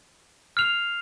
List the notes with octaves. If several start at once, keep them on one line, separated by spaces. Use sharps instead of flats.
F6 C7 F7